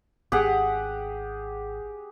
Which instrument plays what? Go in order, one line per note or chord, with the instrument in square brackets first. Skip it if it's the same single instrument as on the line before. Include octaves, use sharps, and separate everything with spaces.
[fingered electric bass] G#1 [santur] G4 G#4 F#5